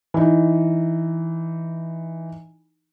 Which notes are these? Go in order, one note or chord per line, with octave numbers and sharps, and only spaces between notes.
E3 D#4